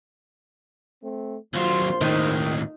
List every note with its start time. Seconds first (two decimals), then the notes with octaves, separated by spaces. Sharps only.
1.03 A3 C4
1.54 A#1 D#2 F#3 F4 C5 C6
2.01 D#2 A2 D#3 D#4